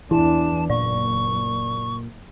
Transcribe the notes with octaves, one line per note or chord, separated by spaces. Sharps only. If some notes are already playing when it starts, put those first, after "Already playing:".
E2 E3 D4 E4 A5
F#1 A#2 D5 C#6